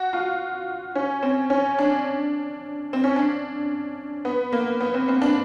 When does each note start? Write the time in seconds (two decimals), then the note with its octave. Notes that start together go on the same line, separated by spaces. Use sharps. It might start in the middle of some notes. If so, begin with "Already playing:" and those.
Already playing: F#4
0.13 F4
0.95 C#4
1.22 C4
1.50 C#4
1.78 D4
2.93 C4
3.04 C#4
3.16 D4
4.25 B3
4.52 A#3
4.80 B3
4.94 C4
5.08 C4
5.22 D4